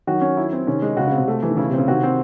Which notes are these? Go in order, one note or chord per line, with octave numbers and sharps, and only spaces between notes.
D#3 F#3 F#4
C#4
E4
C4
C3 D#3 C#4
G#3
C#3 F#4
C#3
C4
C3
A3
E3
D#3
C#3 E4
C3
C#3 C4
C3 D#3 F#4
C4